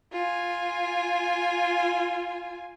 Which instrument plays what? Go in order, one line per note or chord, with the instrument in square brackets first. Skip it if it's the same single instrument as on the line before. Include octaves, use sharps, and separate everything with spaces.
[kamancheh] F4 G#5